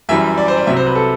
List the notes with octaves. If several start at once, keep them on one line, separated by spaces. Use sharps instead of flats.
F#2 E3 G3 E5
D5
C5
D5
C2 C3 F#3 E5
C5
B4
A4